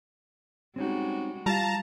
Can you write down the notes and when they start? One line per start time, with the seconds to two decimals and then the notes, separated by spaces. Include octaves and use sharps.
0.76 G3 G#3 C4 C#4 D#4 F#4
1.46 G3 F4 F5 A5 A#5